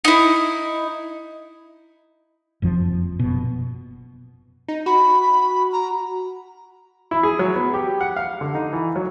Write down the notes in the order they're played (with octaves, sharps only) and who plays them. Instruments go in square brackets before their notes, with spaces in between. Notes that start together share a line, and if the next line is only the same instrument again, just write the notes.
[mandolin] D#4 E4
[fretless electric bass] F#1 F2 F3
F#1 B2
[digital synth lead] D#4
[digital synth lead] F#4 [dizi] B5
[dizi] B5
A#5
[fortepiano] E4
G#4
F#3
B3
G4
F#5
F5
D3
D#4
E3
F#3